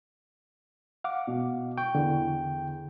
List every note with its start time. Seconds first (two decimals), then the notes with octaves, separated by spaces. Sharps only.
1.04 F5 F#5 D6
1.27 B2
1.78 G5 C#6
1.95 E2 D3